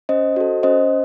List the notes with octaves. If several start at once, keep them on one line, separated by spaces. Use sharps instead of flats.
C#4 C5 D#5
F#4 A4
C#4 C5 D#5